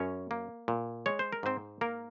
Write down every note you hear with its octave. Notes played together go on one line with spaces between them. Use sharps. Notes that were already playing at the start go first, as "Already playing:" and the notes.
Already playing: F#2 C#4 C#5
A#3
A#2
G#3 C#5
C5
A#4
G#2 C4 C5
A#3 A#4